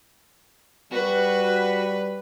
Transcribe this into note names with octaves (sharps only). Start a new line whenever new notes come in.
G3 F#4 B4